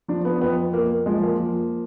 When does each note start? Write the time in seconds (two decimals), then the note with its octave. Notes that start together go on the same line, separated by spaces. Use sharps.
0.08 F3 D4
0.25 B3
0.41 F2 B3
0.73 F2 A#3
1.06 F3 G#3
1.23 A#3
1.39 F3